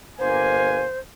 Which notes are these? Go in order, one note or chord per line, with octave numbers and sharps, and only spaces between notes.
G1 A#3 C5 G#5